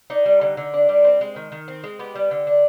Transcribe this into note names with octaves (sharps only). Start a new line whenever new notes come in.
D4 D#4
G3
D3
D3
D4
G3
C4
G#3
D#3
D#3
C4
G#3
B3 G4
G3
D3
D4